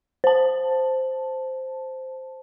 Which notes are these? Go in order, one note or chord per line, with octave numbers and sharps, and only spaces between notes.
C5 A5